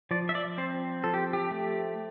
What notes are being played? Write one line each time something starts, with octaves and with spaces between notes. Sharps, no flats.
F3 D5
E5
D5
C4 C5
F3 A4
G4
G4
A3